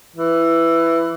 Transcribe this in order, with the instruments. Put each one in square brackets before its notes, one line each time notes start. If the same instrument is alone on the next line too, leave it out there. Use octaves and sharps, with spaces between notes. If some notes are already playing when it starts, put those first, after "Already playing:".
[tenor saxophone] E3